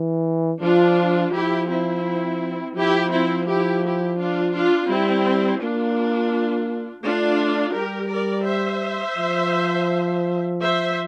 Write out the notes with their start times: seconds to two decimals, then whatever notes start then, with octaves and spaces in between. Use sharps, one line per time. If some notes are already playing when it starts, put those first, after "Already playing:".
Already playing: E3
0.61 F3 D4 F4
1.33 F3 E4 G4
1.68 C4 E4
2.75 F3 E4 G4
3.11 C4 E4
3.46 E4 G4
3.83 E4 G4
4.18 D4 F4
4.53 D4 F4
4.89 G3 C4 E4
5.61 A#3 D4 F4
7.03 A3 D4 F4
7.74 G3 G4 A#4
8.10 A#4 D5
8.46 C5 E5
9.17 F3
10.60 C5 E5